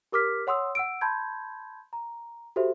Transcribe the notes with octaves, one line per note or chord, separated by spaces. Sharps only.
G4 A#4 D6 F6 B6
C#5 F#5 C6 D#6 E6
F#5 E6 D7
A5 B5 C6 G6 G#6
A#5
F#4 G4 A4 C5 E5